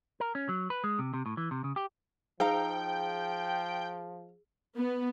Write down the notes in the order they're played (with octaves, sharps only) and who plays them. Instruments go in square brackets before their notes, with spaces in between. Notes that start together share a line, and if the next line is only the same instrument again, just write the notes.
[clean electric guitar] A#4
C#4
F#3
B4
G#3
C3
C3
A2
E3
C3
C#3
G4
[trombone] F3 [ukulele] D#4 F5 A#5 [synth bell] G#4 [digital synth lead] G5
[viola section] B3